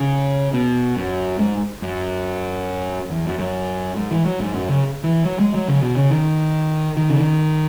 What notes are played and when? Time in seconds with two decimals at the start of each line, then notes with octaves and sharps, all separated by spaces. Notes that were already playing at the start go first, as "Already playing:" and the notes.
Already playing: C#3
0.53 B2
0.97 F#2
1.39 G#2
1.82 F#2
3.10 E2
3.25 F#2
3.39 F#2
3.96 G#2
4.11 E3
4.25 F#3
4.40 G#2
4.54 F#2
4.68 C#3
5.04 E3
5.25 F#3
5.39 G#3
5.54 F#3
5.68 C#3
5.83 B2
5.97 C#3
6.11 D#3
6.97 D#3
7.10 C#3
7.18 D#3